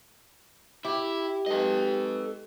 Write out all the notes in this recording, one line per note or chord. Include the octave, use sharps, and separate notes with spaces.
E4 G4
G#3 D#4 A4 B4 D#5